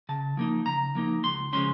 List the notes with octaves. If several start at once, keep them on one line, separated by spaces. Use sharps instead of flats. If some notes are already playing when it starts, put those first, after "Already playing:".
C#3 A5
F3 A#3 D#4
C#3 A#5
F3 A#3 D#4
C#2 C6
C#3 F3 G#3 C#4 C6